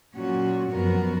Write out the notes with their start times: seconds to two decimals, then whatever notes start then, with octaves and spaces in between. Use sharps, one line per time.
0.15 A#2 F#3 C#4 F#4
0.72 F#2 F3 B3 F#4 A#4